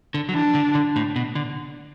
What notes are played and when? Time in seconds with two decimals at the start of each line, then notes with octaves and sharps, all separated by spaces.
0.14 D3
0.29 F#3
0.34 E3 D4
0.55 D3
0.75 D3
0.96 A2
1.16 B2
1.35 D3